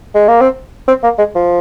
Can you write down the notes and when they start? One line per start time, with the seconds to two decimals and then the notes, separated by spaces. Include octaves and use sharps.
0.15 G#3
0.28 A#3
0.41 C4
0.88 C4
1.03 A#3
1.19 G#3
1.35 F3